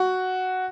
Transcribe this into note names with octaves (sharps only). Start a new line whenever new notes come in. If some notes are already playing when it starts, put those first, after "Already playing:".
Already playing: F#4